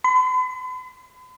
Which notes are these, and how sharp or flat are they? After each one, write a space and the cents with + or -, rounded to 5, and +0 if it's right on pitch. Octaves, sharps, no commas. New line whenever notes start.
B5 +45